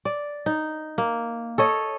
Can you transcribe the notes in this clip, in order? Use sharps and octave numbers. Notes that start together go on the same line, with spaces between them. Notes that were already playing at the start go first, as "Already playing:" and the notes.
D5
D#4
A#3
A4 C#5 D#5